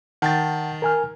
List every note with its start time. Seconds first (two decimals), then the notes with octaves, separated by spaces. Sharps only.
0.22 D#3 F#5 G5 A5 A6
0.82 A#4 G#5 F6